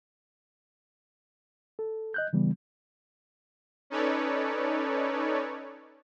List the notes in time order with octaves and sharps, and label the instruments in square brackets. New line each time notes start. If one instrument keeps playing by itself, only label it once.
[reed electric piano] A4
D#5 F#6 G6
C#3 E3 G3 B3
[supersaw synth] C#4 D#4 A4 B4 C#5 D5